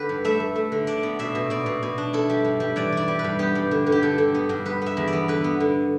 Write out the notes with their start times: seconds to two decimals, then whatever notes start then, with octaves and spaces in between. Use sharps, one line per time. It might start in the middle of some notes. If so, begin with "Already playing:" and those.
Already playing: D3 G4 B4
0.09 G2
0.25 A3 E5
0.40 A3
0.56 A3
0.72 D3
0.87 D4 D5
1.03 B3
1.19 B2 E5
1.35 B2
1.50 B2 D5
1.66 B2
1.83 B2
1.98 D4
2.13 E4 A4
2.29 G3
2.45 G2
2.60 G3
2.76 E3 D5
2.92 E4 D5
3.08 G3
3.19 B4
3.24 G2
3.39 B3 G4
3.55 G2
3.71 D3
3.86 D3
3.92 G4
4.02 D3 A4
4.18 D3
4.34 B3
4.49 G2
4.65 B3 B4
4.82 B3 E5
4.97 E2
5.07 D5
5.13 B3
5.28 D3 B4
5.44 B3
5.60 D3